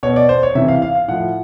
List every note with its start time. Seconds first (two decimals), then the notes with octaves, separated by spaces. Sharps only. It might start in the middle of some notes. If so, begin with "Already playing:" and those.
0.03 B2 C#5
0.16 D5
0.29 C5
0.43 C#5
0.55 C3 E3 E5
0.68 F5
0.82 F5
0.95 F5
1.08 A2 F3 F#5